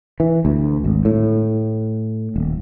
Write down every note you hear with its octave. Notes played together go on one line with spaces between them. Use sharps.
E3
D2
G#1
A2
D#1